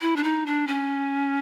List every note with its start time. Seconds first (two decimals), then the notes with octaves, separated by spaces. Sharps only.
0.01 E4
0.16 D4
0.24 D#4
0.46 D4
0.67 C#4